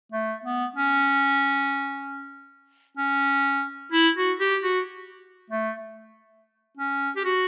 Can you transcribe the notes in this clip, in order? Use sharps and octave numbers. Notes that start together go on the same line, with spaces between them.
A3
B3
C#4
C#4
E4
F#4
G4
F#4
A3
C#4
G4
F#4